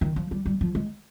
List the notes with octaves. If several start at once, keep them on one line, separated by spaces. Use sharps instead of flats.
D#3
F3
G3
G3
F3
G#3